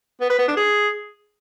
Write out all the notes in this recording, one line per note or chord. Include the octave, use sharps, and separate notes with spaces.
B3
B4
B3
D4
G#4